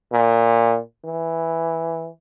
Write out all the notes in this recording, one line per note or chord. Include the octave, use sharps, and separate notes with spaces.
A#2
E3